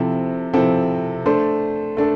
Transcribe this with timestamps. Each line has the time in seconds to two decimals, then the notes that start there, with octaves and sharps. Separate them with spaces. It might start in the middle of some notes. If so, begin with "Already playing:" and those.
Already playing: C3 F3 C4 E4 A4
0.53 C3 F3 C4 E4 A4
1.26 A3 D4 A4 C5
1.97 A3 D4 A4